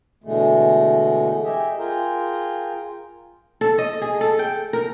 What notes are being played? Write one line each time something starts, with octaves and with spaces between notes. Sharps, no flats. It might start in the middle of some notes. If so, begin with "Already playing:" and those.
B2 D3 E3 G#3 A3
G4 G#4 D#5 E5
F4 G#4 A#4 G5
A4
D#5
G#4
A4
G5
A#4